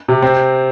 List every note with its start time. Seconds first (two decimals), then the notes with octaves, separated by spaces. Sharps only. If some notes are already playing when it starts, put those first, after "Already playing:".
0.08 C3
0.22 C4